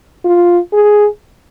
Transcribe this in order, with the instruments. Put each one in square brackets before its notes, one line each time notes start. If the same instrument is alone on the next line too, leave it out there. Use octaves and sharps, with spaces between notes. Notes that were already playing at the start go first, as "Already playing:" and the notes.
[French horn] F4
G#4